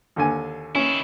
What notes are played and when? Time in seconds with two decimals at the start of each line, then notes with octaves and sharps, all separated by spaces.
0.16 D#2 D3 G#5
0.75 D#3 C#4 E4